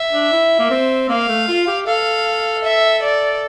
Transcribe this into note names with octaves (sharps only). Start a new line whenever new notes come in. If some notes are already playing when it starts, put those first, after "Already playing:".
Already playing: E5
D4
E4
A#3
C4
A#3 F5
A3
F4
G4
A4 F5
E5
D5